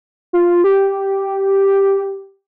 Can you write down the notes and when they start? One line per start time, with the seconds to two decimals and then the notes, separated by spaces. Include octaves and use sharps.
0.33 F4
0.64 G4